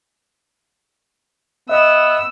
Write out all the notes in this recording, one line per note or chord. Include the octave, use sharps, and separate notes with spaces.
B3 D#5 E5 E6